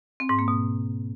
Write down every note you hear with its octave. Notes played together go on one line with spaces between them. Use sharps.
C4
G#2
A#3
B2